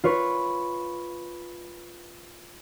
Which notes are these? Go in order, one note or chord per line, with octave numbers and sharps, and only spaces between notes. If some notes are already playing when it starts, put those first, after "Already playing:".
F4 B4 C#5